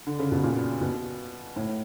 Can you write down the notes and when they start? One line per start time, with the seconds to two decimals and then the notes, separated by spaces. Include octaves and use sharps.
0.07 D3
0.19 C#3
0.32 B2
0.44 A#2
0.81 B2
1.56 A2